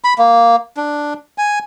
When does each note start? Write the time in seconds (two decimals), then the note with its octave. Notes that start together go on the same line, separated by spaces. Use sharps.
0.04 B5
0.19 A#3
0.77 D4
1.38 G#5